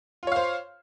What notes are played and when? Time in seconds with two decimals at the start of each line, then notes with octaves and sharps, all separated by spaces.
0.23 F4
0.27 C#5
0.32 F5
0.36 C5